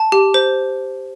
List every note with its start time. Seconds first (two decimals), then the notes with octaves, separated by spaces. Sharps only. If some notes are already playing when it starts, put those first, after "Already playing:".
Already playing: A5
0.12 G4
0.34 C5